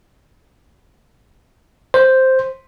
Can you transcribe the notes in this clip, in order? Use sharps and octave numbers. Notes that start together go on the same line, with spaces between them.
C5